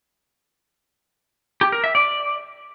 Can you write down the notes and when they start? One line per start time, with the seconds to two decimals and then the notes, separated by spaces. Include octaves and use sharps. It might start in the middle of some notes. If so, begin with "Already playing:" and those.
1.61 G4
1.72 A#4
1.84 E5
1.95 D5